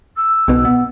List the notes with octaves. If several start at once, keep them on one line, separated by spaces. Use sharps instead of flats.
E6
B1 B2
B3